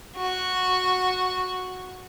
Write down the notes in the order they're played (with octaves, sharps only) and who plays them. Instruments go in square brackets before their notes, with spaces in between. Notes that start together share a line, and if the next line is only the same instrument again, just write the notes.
[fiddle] F#4